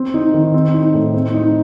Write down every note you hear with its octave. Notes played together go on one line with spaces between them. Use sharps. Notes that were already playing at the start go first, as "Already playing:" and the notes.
Already playing: C4
D#4
D#3
C4
D#4
A2
C4
D#4